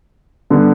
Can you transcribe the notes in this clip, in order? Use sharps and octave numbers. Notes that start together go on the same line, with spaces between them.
D3 G3 B3